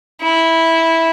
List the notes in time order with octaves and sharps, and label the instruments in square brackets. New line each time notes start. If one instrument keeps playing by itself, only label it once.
[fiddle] E4